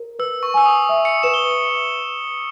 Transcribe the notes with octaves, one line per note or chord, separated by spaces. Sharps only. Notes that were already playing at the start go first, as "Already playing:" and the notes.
Already playing: A#4
B4 E6
C#6
G#5 E6
D#6
E5
C#7
B4 E7
G7